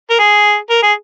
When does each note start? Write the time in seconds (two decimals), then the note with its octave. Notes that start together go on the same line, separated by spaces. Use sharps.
0.10 A#4
0.19 G#4
0.70 A#4
0.83 G#4